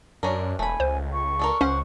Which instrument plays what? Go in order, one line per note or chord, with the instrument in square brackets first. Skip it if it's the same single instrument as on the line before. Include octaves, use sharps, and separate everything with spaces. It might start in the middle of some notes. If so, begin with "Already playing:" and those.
[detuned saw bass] F#2 [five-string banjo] C#4 D4 A#4
[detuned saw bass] E1 [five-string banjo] A3 B5 [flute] G#5
[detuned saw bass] C#2 [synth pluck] C5
[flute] C#6
[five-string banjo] D4 A4 A#4
[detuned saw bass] C#2 [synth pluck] C#4 [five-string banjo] C5 F#5